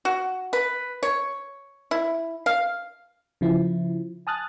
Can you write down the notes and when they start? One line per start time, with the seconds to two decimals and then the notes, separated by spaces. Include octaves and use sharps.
0.05 F#4
0.53 B4
1.03 C#5
1.91 E4
2.46 F5
3.41 C#3 F3 E4
4.27 G#5 A5 D#6 F6 F#6 A6